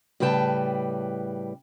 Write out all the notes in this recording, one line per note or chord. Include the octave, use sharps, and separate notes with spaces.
A2 C#3 G3 B4 G5 A5